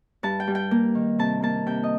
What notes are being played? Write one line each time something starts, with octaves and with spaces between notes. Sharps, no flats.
G2 A5
G5
G3
G5
A#3
D#3
C3 A5
A#3 A5
C3 G5
D#5